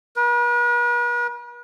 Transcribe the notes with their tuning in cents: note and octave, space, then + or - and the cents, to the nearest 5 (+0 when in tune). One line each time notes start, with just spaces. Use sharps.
B4 -45